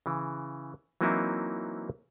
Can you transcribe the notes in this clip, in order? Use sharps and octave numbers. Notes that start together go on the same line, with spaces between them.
C#3 E3
E3 F#3 A#3 C4 D#4 E4